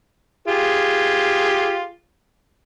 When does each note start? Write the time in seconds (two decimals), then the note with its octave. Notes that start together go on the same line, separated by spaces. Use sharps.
0.48 F4 G4 G#4